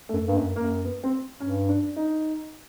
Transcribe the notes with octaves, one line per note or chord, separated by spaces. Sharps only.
A3
F#2
G2 A#3
F#2
F#2 A#3
B3
C4
G2 C#4
D4
D#4